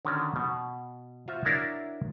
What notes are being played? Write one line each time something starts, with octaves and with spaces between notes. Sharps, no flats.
D3 D#3 C#4 F#4 D5
B2
F4 F#4 C5 E5
D4 E4 F#4 A#4 C#5 D5